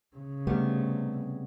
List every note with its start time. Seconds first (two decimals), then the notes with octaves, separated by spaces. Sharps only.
0.17 C#3
0.47 C3 G3 A3 B3